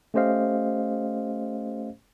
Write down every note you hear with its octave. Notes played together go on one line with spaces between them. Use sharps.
A3 C#4 G4 C5 D#5 F5